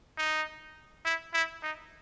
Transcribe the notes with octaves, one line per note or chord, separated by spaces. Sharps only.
D#4
E4
E4
D#4